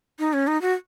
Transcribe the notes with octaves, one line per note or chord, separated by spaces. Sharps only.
D#4
C#4
D#4
F#4